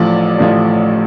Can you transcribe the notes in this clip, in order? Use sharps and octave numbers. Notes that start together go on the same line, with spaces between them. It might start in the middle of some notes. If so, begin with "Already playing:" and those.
Already playing: A1 A2 F3 D5
A1 A2 F3